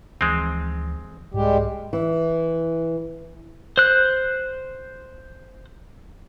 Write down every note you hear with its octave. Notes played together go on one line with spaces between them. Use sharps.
D2 E3 F3 G#3 C4
C2 G#2 G3 G#3 G4
E3
C5 F#6